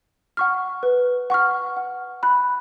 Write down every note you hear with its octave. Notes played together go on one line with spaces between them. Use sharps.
F#5 C#6 F6
B4
F#5 C#6 F6
F#5
B5 F#6